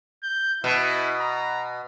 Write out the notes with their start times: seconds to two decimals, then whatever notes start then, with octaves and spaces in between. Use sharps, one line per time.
0.23 G6
0.64 B2 E4
1.20 A#5